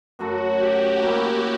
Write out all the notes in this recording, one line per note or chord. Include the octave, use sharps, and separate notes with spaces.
F#2 C#3 F#3 A3 F#4
G4
A#3 C#4 E4 G4